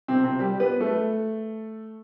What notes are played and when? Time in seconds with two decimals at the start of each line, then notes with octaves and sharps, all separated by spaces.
0.08 C3 C4
0.24 C3 C4
0.39 G3 G4
0.60 B3 B4
0.80 A3 A4